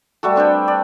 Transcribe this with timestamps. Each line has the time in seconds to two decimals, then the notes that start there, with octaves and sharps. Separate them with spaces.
0.23 G3 A3 F#4 A4
0.36 C4 D4 B4 G5
0.68 D5